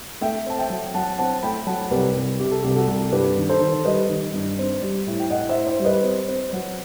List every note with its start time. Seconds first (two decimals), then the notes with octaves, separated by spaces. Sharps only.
0.21 A3 E5 G5
0.46 C4 A5
0.59 E5 G5
0.70 F#3
0.94 F#3 F#5 A5
1.19 C4 F#5 A5
1.43 A3 G5 B5
1.67 F#3 F#5 A5
1.91 C2 G4 B4
2.16 C2
2.39 C3 G4
2.51 A4
2.62 C2 G4
2.76 F#4 A4
2.88 C2
3.12 G2 G4 B4
3.37 D#3
3.49 A4 C5
3.61 D#3
3.85 G3 B4 D#5
4.09 D#3
4.34 G2
4.59 C4
4.82 G3
5.07 A2
5.20 G5
5.30 A2 D#5 F#5
5.49 C5 E5
5.55 A2
5.67 C5 E5
5.79 G3
5.85 B4 D#5
6.03 C4
6.28 C4
6.53 F#3